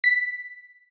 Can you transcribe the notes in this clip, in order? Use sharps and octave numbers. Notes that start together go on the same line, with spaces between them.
B6